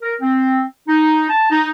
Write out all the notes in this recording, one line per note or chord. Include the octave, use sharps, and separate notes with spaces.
A#4
C4
D#4
A5
D#4